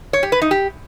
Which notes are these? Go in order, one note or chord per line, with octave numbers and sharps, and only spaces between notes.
C#5
G4
B4
D#4
G4